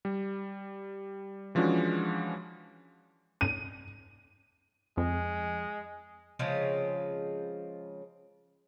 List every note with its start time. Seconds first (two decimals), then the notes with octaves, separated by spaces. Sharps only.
0.05 G3
1.55 E3 F3 G#3 C#4 D4 F#4
3.41 D#7
4.97 F2 G#3
6.39 C#3 F3 G#3 C4